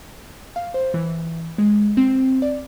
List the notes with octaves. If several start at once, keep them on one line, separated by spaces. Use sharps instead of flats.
F5
C5
E3
G#3
C4
D5